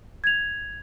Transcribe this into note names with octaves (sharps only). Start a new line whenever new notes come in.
G#6 F7